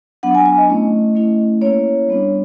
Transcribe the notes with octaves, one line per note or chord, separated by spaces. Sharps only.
F#3 B3 D4 F#5
G#5
G#5
D#5
A3 C#4 E4
A3 C#4 E4
A#3 C#4 E4 C#5
G3 B3 D4